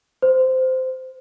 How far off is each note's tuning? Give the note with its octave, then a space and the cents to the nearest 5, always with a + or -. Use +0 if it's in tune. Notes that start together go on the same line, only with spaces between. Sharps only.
C5 -15